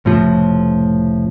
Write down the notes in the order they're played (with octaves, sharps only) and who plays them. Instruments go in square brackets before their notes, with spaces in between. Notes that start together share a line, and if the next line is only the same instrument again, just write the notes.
[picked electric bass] F1 A2 C#3 F3